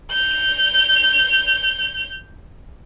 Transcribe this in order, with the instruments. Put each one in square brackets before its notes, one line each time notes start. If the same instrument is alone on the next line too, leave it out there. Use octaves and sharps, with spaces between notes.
[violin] G6 F7